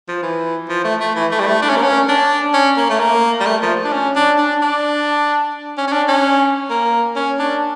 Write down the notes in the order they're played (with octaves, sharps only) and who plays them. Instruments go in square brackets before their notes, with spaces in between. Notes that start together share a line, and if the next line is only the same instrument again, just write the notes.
[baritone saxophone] F3
E3
F3
A3
A3
E3
A3
G3
A3
D4
C#4
A#3
C#4
D4
C#4
A#3
A3
A#3
G3
A3
F3
D4
C#4
D4
D4
D4
C#4
C#4
D4
C#4
A#3
C#4
D4